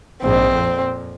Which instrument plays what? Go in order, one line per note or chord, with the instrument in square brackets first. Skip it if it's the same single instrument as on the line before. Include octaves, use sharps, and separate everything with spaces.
[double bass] A#1 G#2 [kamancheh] C4
[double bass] F2 A#2